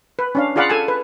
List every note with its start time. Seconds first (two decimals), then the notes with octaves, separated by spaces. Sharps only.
0.19 B4
0.35 C#4 D4 F5
0.56 F4 G#4 D5 F5 F#5 B5
0.70 A4 G#5 A5
0.88 B4